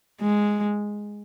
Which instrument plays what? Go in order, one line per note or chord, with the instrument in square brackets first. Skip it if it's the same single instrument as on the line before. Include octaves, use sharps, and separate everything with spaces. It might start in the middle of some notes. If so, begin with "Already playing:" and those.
[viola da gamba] G#3